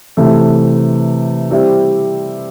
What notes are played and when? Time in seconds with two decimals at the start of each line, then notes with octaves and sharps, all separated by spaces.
0.17 C3 E3 A3
1.51 G3 C4 E4 G4